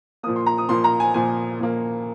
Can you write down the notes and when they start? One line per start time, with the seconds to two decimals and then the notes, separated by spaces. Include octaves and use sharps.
0.23 A#2 F3 A#3 D#6
0.36 C6
0.46 A#5
0.58 D#6
0.69 A#2 F3 A#3 C6
0.84 A#5
1.00 G#5
1.14 A#2 F3 A#3 G#5
1.60 A#2 F3 A#3